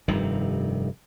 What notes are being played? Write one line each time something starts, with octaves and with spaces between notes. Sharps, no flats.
F1 G2 C3 D#3